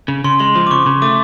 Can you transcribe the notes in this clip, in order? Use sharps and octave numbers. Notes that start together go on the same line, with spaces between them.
C#3
C#3 C6
G#3 C6
F3
D6
C#3 C#6
C#3
A3 D6